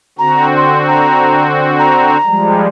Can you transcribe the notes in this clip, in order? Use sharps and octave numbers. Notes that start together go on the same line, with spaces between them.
D3 C4 F#4 A#5
C6
A#5
A#5
F3 G3 G#3